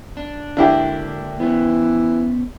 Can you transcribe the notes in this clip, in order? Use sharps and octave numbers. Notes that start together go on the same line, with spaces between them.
D4
D3 A#3 D4 E4 G4
E3 B3 C#4